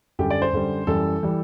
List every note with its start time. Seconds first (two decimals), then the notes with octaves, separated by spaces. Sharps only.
0.19 F#2 D3 G3 G4
0.30 D5
0.42 C5
0.53 F#2 D3 G3
0.87 F#2 E3 G3 A4
1.23 E3 G3